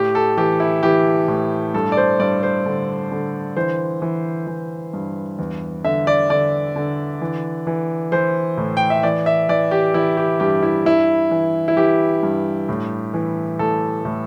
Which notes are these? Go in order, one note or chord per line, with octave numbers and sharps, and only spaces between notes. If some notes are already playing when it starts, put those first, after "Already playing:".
Already playing: A2 G4
A4
E3 G4
E4
E3 G4
A2
G2 A4
D5
C5
G2 D5
C5
D3
D3
E3 C5
E3
E3
G2
E2
D3 E5
D5
D3 D5
D3
E3
E3
E3 C5
A2
G5
E5
E3 D5
E5
E3 D5
G4
E3 E4
G4
G2 G4
E4
G2 E4
E3
E4
E3 G4
G2
A2
E3
A2 A4
A2